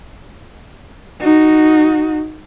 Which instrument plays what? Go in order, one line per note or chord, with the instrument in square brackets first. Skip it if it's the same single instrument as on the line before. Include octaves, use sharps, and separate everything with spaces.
[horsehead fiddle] D#4 F#4